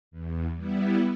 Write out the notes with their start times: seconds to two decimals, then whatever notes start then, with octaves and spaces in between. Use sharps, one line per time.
0.11 E2
0.56 G3 B3 E4